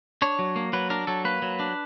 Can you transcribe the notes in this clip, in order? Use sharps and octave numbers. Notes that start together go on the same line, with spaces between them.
D4 C#5
F#3
A#3
F#3 B4
D4 A#4
F#3 A4
A#3 B4
F#3
D4